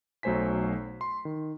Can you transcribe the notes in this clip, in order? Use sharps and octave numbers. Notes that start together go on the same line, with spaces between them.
B1 F#3 A3 C5 G#5 B6
C6
D#3